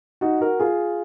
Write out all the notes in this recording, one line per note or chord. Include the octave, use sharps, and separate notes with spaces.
D#4 F#4
F#4 A#4
F4 G#4